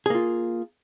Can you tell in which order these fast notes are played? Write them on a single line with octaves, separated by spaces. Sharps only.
G#4 A#3 F4